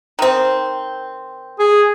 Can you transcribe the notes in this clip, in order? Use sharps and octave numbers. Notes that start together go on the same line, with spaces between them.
D#3 C4
G#4